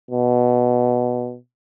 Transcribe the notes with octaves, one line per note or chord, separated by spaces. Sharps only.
B2